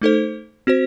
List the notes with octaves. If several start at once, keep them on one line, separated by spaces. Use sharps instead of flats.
A3 D#4 A4 C5
C4 F#4 C5